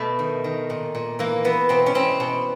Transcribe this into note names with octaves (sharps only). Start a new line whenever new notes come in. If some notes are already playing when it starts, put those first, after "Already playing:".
Already playing: B2 A3
D#3
D#3
A#2
A#2
E3 A#3
E3 B3
B2 C4
C#4
B2 C4
B2